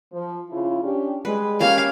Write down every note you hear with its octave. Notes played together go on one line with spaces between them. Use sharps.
F3
C#3 E4 F4
C#4 D4 G4
G3 G#3 B4
A#3 C#4 G4 F5